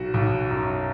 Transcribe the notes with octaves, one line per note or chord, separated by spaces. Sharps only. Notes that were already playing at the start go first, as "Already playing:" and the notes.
Already playing: B1 F#4
B1
F#2